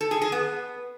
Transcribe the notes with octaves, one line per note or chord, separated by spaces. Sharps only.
A4
G#4
G#4
B3